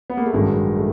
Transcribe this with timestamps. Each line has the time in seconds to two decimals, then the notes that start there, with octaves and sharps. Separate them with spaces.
0.10 B3
0.17 A#3
0.26 A3
0.33 A1 G2 D#3 F#3 G#3
0.76 A3